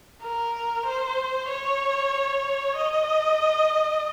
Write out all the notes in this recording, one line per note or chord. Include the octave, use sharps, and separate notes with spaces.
A#4
C5
C#5
D#5